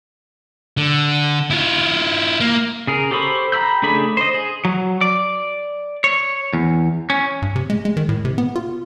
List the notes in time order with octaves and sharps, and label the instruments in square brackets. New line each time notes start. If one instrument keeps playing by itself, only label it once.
[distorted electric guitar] D3
E4 F4
A#3
[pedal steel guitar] C#3 G#4 A#4
G4 A4 C5 B5 C#6
G5 A#5 B5 E6 G6
C#3 A3 D4 G#4 B5
C5 D#5
G#4
[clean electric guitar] F#3
D5
C#5
E2
C#4
[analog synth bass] G2
C3
G#3
G#3
D#3
A2
C3
B3
F4